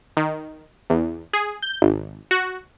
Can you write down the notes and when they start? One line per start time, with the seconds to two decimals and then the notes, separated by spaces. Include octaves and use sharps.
0.17 D#3
0.90 E2
1.33 G#4
1.62 G6
1.82 G#1
2.31 F#4